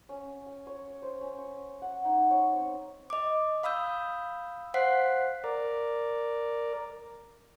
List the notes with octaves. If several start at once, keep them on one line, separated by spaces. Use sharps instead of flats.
C#4
G#5
C#5
C5
C#4
C#6
F#5
D#4
C#5
C4
D#5 D6
F5 B5 D#6 E6 G6
C5 F5 F#5 F#6 B6 C7
A#4 D5